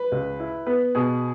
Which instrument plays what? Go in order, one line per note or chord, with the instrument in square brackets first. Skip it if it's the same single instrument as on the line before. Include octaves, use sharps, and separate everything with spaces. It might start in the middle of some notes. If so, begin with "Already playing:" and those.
Already playing: [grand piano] B4
[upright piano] C#2
E4
[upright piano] B3 [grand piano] B4
[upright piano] B2 [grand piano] G#4